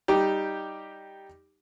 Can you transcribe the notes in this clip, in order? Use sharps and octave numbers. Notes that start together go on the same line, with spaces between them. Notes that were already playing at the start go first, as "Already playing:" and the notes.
G3 D#4 G4